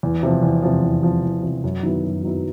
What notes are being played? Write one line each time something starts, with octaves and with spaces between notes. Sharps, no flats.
E2
C3 F3
E2
C3 F3
E2
C3 F3
E2
C3 F3
F#2
D#3 F#3 B3 E4
F#2
D#3 F#3 B3 E4